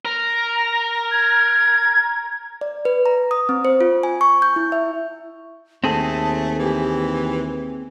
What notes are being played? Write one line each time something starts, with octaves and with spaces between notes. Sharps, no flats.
A#4
G#6
D5
B4
A#5
D#6
C4
C5
F4
G#5
C#6
G6
E4
E5
D#2 A3 C4 G#4 A5
E3 G4